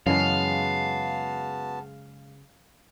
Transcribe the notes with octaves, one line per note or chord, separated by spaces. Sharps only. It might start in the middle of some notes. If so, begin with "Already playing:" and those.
F#2 C#3 E3 G#3 B3 F#4 F5 A5